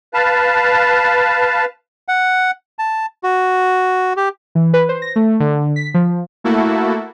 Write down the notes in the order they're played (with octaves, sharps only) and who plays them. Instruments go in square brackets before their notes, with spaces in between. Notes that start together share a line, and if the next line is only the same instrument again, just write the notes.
[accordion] B4 F5 A5
[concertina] F#5
A5
F#4
G4
[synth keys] E3
B4
C5
A#6
A3
D3
B6
F3
[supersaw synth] A3 A#3 E4 F#4 A4